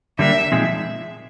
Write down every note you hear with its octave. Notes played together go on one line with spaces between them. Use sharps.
D3 G3 A#3 D4 E5
A#2 F3 G#3 C4 D#4